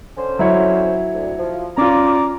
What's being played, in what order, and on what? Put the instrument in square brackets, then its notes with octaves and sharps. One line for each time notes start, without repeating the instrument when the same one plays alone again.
[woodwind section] D3 C#4 C5
[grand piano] F#3 E4 C#5
[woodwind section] D2
F3
[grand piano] C#4 F4 [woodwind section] D5 A#5 D6